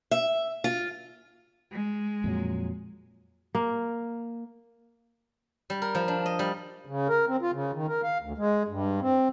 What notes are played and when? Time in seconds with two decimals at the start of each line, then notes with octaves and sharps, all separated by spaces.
0.11 E5
0.64 F4
1.70 G#3
2.24 F2 A#2 F#3
3.55 A#3
5.70 G3
5.82 A#4
5.95 F3
6.08 D4
6.26 D#5
6.39 G3
6.86 C#3
7.09 A#4
7.28 C4
7.42 F4
7.53 C#3
7.73 D#3
7.88 A#4
8.03 F5
8.21 D2
8.38 G#3
8.68 G2
9.01 C4